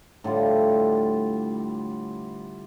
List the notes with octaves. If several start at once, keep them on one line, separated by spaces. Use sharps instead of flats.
A2 D3 G3 F4